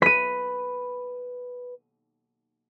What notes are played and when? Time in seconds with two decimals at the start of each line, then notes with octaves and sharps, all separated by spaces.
0.02 B4 B6 D#7